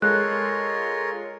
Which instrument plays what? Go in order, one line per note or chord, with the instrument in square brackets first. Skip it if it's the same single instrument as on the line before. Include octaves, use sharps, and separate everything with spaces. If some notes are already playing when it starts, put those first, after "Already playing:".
[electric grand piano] G#3 A4 [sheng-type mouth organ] F4 A#4 C#5 [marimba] F#6